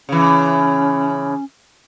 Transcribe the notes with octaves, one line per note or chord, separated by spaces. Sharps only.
C#3 E3 C#4